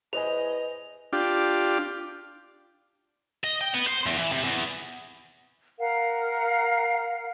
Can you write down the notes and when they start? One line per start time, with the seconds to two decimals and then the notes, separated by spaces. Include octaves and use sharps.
0.13 E2 B4 C5 D#5 G#5 F7
1.13 D4 F4 G4
3.44 D#5
3.61 G5
3.74 B3
3.87 C5
4.06 E2
4.19 E3
4.32 C3
4.45 E2
5.78 A#4 F5 F#5